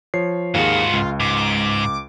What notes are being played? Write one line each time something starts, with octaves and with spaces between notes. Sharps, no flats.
F3 C#5 C7
D#2 G#2 F4 F#4 G#4
C#2
G#2 D6